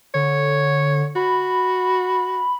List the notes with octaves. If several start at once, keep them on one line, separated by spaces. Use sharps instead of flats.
D3 C#5
F#4 B5